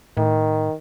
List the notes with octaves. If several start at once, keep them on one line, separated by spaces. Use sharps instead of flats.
A2 D#3